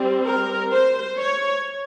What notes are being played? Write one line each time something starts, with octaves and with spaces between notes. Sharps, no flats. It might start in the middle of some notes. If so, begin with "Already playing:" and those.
Already playing: G3 C4
A#4
C5
C#5